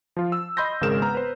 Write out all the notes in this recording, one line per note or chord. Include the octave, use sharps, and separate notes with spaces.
F3 F4
E6
D#5 B5 C6 G6 A#6
G#1 C#3 G#3 G#4 A#4 E7
B3 A#5 F6
B4 C5